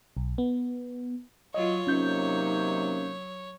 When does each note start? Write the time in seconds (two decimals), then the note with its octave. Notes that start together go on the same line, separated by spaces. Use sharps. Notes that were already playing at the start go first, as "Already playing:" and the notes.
0.17 B1
0.38 B3
1.54 F#3 F4 C#5 D#5
1.87 C3 F#3 A#3 C#4 D#4 G6